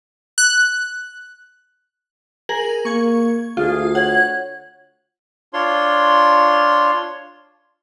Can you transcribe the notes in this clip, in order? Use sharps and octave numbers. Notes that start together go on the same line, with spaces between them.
F#6
G#4 A#4 F#7
A#3 C#6 G#6
D2 F4 G#4
C#5 F#5
D4 F4 C#5 C6